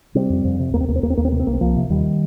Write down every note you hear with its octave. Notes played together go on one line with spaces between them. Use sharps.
C3 G3 C4
F2
F2
C3
D#2 A#3
C4
D#2 A#3
C4
D#2 A#3
C4
D#2 A#3
C4
C3 A#3
C4
C2 A#3
C4
C2 F3 A#3
C3
D#2 D#3 G3